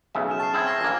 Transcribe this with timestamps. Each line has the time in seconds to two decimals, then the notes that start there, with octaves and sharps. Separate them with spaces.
0.15 B1 C#3 E5
0.28 F6 E7
0.39 A5 C#6 F6 C7
0.54 C4 E4 G#4 G#6 E7 F#7
0.66 E6 A#6 C7
0.81 A#1 A#3 G#5 C7